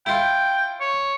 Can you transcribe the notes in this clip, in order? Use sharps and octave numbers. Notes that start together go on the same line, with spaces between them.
E4 F4 G5
C#5